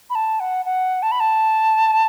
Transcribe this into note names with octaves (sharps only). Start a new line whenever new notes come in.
B5
A5
F#5
F#5
A5
B5
A5